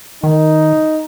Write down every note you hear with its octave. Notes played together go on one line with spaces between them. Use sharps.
D#3 D#4